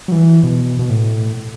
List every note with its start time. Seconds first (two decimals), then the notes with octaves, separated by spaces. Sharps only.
0.08 F#3
0.12 E3
0.43 B2
0.79 B2
0.90 A2